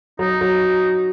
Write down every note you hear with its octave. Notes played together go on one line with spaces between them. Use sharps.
F#3 D#4
F#3